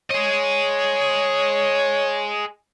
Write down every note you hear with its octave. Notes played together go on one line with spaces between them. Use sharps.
G#4 C#5 D#5